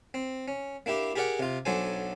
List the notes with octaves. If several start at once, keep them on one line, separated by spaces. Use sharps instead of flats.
C4
C#4
A#3 D4 E4 G4
G4 G#4 A#4 D5 F#5 G5
C3 F4
B1 F#3 D4 A4 C5 G#5